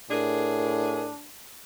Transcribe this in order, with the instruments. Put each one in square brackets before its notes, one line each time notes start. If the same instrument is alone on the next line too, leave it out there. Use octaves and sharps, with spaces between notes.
[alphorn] A2 [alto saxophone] D4 [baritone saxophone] G#4 [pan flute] A#4